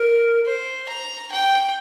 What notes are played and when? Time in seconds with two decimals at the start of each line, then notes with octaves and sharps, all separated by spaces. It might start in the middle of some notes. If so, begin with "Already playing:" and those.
Already playing: A#4
0.46 C5
0.89 A#5
1.32 G5